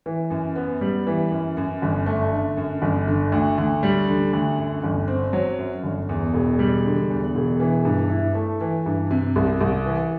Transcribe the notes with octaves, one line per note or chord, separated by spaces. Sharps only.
E3
F#2
B3
G3
E3
F#2
F#2
G1
A3
D3
F#2
G1
D3
D2
D2
G3
D3
D2
F#2
G1
C4
F#3
F#2
G1
E2
E1
G3
D3
E2
E1
E3
G2
E4
A3
E3
G2
C3
C2
C2
E3